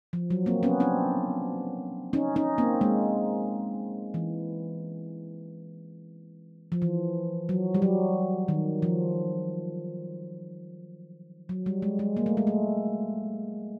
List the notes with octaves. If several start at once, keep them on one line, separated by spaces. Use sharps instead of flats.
F3
F#3
A#3 C4
B3 C#4
C4 D4
C#4 D#4
C#4 D#4
A#3 C4
G#3 A#3
E3
F3
E3
F#3
G3
F#3
D#3
F3
F#3
G3
G#3
G#3
A#3
A3
G#3
A3